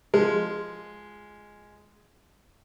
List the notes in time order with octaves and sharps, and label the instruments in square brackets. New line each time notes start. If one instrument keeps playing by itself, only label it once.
[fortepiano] F3 G#3